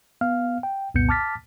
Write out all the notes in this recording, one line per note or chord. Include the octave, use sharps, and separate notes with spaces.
B3 F5 F6
G5
C2 F2 A#2 B3 G6 C#7
A5 D6 F6 A6 B6